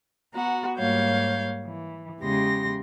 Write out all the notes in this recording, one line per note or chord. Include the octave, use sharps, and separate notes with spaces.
B3 F#4 F#5 A#5
G#2 G3 A#3 C#5 F5 G6
E3
E2 C#3 G#3 G4 C6 A#6